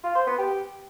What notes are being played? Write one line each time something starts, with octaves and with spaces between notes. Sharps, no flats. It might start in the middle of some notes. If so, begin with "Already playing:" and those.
F4
C5
B3
G4